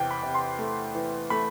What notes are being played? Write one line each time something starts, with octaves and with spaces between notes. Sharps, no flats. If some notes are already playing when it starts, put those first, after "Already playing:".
Already playing: E2 C3 G5
B5
C3
C6
A3
E3
A3 B5